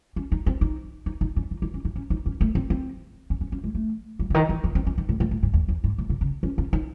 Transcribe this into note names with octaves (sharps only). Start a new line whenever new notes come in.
C#4
D#4
C4
D#4
D#4
D#4
C#4
D#4
D#4
C#4
D#4
C#4
D#4
C#4
A3
C4
C4
C#4
C#4
C#4
G#3
A3
F#3
C#3
D#3
E3
E3
C4
C#4
D#3
A2
A2
A2
G#2
E2
E2
G#2
A2
C3
C#3
C#4
C#4
D#4